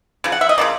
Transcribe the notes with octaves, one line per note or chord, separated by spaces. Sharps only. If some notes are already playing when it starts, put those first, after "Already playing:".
C#3 F3
F#5
E5
D#5
C#3 F3 A#3 D5